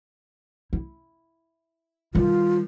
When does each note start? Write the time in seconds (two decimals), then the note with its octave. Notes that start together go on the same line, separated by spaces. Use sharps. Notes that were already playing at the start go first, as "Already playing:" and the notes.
0.73 E4
2.15 D#3 G3 F4